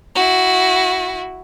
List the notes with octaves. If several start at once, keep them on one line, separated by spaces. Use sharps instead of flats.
E4 F#4